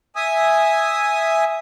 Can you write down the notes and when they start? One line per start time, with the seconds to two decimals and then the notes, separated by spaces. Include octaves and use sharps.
0.16 E5 G#5 D#6